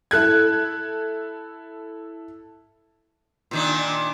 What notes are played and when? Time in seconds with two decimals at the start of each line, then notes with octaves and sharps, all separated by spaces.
0.11 E4 A4 F#6 G#6
3.51 A#2 D#3 D4